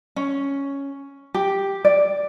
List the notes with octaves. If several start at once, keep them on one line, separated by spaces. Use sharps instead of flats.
C#4
G4
D5